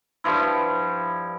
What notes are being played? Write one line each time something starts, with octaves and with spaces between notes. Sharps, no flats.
G2 F3 E4